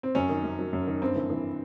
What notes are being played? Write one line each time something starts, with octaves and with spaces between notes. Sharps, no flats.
C4
F#2 C#4
D#3
F#2
F#3
F#2
D#3
G2 C4
E3
E3